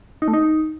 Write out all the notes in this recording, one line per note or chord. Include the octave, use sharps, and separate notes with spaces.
D#4
A3
D#4